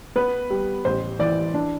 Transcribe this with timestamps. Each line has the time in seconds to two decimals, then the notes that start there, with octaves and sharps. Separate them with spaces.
0.16 B3 B4
0.50 G3
0.85 A1 C5
1.19 E3 D5
1.54 D4